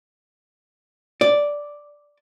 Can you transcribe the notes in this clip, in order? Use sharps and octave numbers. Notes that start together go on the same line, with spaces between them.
D5